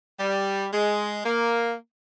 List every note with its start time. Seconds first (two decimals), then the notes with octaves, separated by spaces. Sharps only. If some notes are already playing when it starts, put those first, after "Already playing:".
0.20 G3
0.73 G#3
1.26 A#3